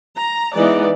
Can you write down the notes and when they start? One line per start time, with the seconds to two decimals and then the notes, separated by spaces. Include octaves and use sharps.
0.17 A#5
0.57 E3 G#3 B3 D#4 D5